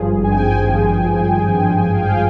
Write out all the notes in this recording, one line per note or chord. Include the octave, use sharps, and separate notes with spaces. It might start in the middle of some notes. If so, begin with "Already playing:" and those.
Already playing: G#1 G2 F3 G#4
G#1
G#5
G5
G#5
G2 F3
G#1
G2 F3
F5
G#1 G5